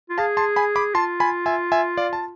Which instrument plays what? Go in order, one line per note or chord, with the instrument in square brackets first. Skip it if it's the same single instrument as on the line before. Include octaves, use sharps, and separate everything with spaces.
[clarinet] F4
[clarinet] G#4 [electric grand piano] F5 A5
[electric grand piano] A5 C6
G#5 B5
B5 D6
[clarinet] F4 [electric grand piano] A5 C6
[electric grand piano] G#5 B5
E5 G#5
E5 G#5
D5 F5
A5